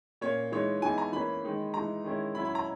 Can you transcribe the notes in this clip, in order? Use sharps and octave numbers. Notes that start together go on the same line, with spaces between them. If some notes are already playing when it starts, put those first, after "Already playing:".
A#2 A#3 C#4 C#5
E3 G#3 D#4 C#5
E3 G#3 B3 D#4 G#5
A#5
E3 A#3 C#4 B5
D#3 G#3 D#4
E3 G#3 D#4 A#5
D#3 G#3 C#4 E4
F#3 C#4 E4 B5
B5
A#5